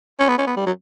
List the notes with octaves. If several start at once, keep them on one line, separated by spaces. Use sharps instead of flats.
C#4
B3
C#4
B3
G3
F#3